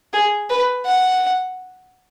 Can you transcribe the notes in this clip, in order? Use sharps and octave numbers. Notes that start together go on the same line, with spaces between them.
G#4
B4
F#5